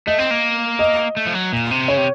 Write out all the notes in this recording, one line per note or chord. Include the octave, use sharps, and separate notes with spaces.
A3 D#5
C4
A#3
D#5
A3
F3
F#3
A#2
C3
C#3 C#5
C3